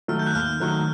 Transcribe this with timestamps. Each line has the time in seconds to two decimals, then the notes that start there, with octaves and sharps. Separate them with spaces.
0.08 D#3 F#3 A3 F6
0.19 G6
0.27 F#6
0.35 D#2 F6
0.60 D#3 F#3 A3 F#6